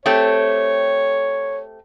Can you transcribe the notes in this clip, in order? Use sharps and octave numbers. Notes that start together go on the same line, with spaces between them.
A3 C4 G4 C#5